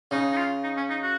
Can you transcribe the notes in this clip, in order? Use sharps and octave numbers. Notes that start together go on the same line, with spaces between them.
C#3 D#4
D#4
F4
D#4
C#4
D#4
F#4